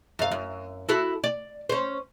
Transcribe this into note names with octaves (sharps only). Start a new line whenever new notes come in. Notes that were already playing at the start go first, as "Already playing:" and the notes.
F#2 F5
F#2
E4 F#4 A4
D5
C#4 C5